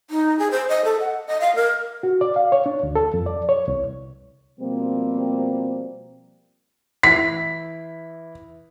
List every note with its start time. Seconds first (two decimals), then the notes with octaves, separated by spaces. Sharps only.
0.10 D#4
0.39 G#4
0.51 C5
0.69 D#5
0.84 A4
1.00 F#5
1.27 D#5
1.41 F5
1.56 A#4
2.03 F#4
2.21 D5
2.36 F5
2.52 C#5
2.66 D4
2.83 D2
2.95 A4
3.14 F2
3.26 D5
3.49 C#5
3.68 C2
4.60 B2 F3 G3 A#3 C4
7.03 E3 E4 B6